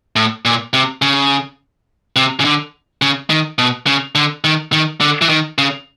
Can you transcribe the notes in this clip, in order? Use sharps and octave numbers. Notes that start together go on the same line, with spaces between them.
A2
A#2
C3
C#3
C3
C#3
D3
C#3
D#3
B2
C#3
D3
D#3
D#3
D3
E3
D#3
C#3